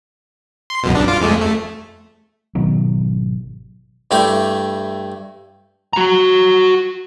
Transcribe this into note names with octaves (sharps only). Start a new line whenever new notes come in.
C6
C#2 F#2 B2
C2 G2 D4
F4 D6
F2 G#3 A3
A3
G#1 B2 D#3 F#3
G2 A3 E4 G5 C6 D6
F#4 A#5